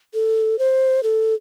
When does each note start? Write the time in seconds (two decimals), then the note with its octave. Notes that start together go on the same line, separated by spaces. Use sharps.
0.14 A4
0.59 C5
1.03 A4